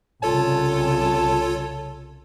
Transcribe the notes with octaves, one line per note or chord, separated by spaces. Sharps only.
C2 C#3 F4 A4 C#5 A5